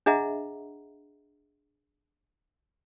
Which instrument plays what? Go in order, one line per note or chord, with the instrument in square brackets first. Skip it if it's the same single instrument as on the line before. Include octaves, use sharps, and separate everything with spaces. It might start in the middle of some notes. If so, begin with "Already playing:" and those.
[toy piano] D4 G#4 D#5 E5 F#5 A#5